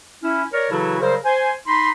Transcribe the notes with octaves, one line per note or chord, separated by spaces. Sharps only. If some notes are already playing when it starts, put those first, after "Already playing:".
C#4 E4
A#4 C#5 D5
C#3 E3 F#3 E4 F#4 A4
C#3 F#3 G3 A#4 C5
C5 G#5
D#4 B5 C6